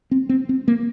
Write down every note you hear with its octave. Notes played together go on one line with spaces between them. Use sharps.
C4
C4
C4
A#3